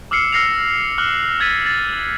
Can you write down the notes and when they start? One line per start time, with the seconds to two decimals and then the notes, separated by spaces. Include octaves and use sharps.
0.11 D6 E6 F6 C7 C#7
0.32 E6 F6 A#6 C7 C#7 F7
0.98 D6 F6 F#6 F#7
1.40 E6 G#6 A6 B6 D#7
1.66 A6